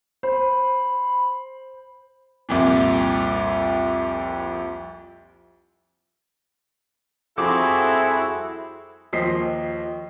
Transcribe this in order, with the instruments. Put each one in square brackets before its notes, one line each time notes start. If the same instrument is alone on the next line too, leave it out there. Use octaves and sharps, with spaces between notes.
[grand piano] C5 [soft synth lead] B5
[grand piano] C2 F2 A#2
[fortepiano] F2 D6 [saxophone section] G3 C4 A4 [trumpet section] E4 [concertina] F#4 G#4
[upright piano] D#2 F3 C5 D#5 B6 C7